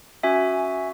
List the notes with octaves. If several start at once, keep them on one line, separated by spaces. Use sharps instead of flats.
C#4 F#4 E5 G#5